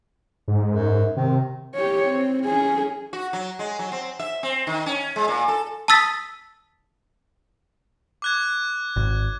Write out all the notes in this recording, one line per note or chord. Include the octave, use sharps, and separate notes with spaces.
G#2
F#2
C3 D#3
G4 C#5
C4
C#4 G#4
F#4
F#3
G#3
F#3
C4
E5
C4
D#3
C#4
G#3
A#2
A4
A5 D#6 E6 A6 B6
D6 F#6 G#6
G#1